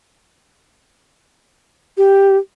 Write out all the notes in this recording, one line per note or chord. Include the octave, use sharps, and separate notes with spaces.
G4